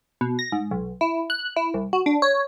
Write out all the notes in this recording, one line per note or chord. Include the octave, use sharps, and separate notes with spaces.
B2
A#6
G#2
B1
E4
F#6
E4
C2
F#4
D4
C#5